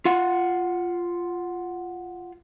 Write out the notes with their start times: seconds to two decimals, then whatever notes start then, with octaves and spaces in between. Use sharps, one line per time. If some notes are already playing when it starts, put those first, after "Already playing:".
0.05 F4 F#5